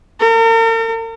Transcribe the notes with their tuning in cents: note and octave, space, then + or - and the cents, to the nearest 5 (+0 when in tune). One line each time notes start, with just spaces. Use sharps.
A#4 -45